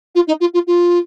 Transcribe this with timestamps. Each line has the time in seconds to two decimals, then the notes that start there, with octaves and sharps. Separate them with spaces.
0.15 F4
0.27 D#4
0.40 F4
0.54 F4
0.67 F4